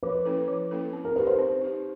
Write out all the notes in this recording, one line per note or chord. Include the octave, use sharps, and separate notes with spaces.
F3 B4
A#3 C#4 E4 A4
F3
A#3 C#4 E4 A4
C4
A#4
D#4 G4 B4
C5
C4
D#4 G4